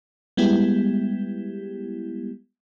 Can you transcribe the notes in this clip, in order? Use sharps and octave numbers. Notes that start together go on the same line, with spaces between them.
G3 G#3 B3 E4 G4